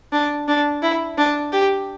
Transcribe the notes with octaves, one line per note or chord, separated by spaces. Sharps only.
D4
D4
E4
D4
G4